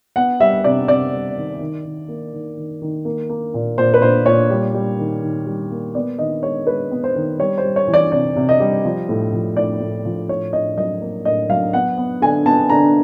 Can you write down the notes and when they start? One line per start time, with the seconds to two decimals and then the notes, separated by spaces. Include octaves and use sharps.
0.16 B3 F#5
0.40 G3 E5
0.64 C3 D5
0.88 C3 D5
1.13 G3
1.37 D#3
1.60 D#3
1.85 D#3
2.08 A#3
2.33 D#3
2.57 D#3
2.82 D#3
3.05 A#3
3.29 A#3
3.54 A#2
3.78 A#2 C5
3.94 B4
4.02 A#2 C5
4.26 A#2 C#5
4.50 G3
4.74 G3
4.99 D#3
5.22 D#3
5.46 G3
5.71 A#3
5.95 B3 D5
6.19 D#3 D#5
6.43 G#3 C#5
6.67 G#3 B4
6.91 B3
7.04 C5
7.16 D#3
7.39 G3 C#5
7.58 C5
7.64 G3
7.76 C#5
7.87 E3
7.94 D5
8.12 C3 D5
8.36 C3
8.49 D#5
8.60 G3
8.85 F3
9.09 A2
9.33 F3
9.57 A2 D5
9.81 A2
10.05 F3
10.29 A2 C#5
10.53 A2 D#5
10.77 F#3 D#5
11.01 A#3
11.25 A2 D#5
11.50 F#3 F5
11.73 B3 F#5
11.98 B3
12.22 D3 G#5
12.46 B3 A5
12.70 D3 A#5